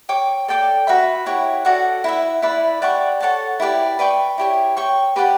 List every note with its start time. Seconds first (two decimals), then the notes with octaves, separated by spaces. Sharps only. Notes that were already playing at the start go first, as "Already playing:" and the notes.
0.09 C#5 G5 D6
0.48 A4 D5 G5 D6
0.87 F#4 B4 E5 B5
1.26 E4 G4 C#5 F#5
1.65 F#4 A4 D5 F#5
2.04 E4 B4 E5
2.42 E4 B4 D5
2.82 G4 D5 F#5 C#6
3.20 A4 C#5 F#5 A5
3.60 E4 G4 B4 D5
3.99 B4 D5 G5 C#6
4.38 E4 G4 C#5
4.77 C#5 G5 C#6
5.16 G4 B4 D5 F#5